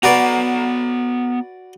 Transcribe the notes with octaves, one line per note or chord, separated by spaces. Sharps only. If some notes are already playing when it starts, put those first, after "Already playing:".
B3 F#4 B4 D5 A#5